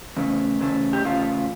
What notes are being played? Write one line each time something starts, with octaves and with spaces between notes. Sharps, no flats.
E2 C#3 A3
E2 C#3 A3
G4
E2 C#3 A3 F4